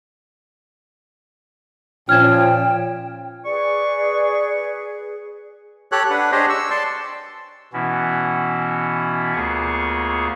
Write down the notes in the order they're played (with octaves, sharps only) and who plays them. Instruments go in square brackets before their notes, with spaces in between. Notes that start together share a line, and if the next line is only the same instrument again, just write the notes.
[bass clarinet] A#2 [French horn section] F3 C#4 [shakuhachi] G5 [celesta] F6 G#6 E7
[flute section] G#4 B4 [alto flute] D5 [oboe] C#6
[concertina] G4 A4 C#5 F#6
D4 B4 F#5
D4 G4 G#4 C5 C#5 D#5
C#6 E6
D5 A5 C6
[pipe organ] B2 E3 B3 C#4 E4 F#4
D2 A#3 B3 F4 G#4 C#6